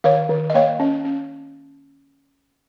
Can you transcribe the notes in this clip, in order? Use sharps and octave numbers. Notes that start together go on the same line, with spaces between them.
D#3 C#5 F5
D#3
D#5
A#3 C#5 F5
C#4
C#4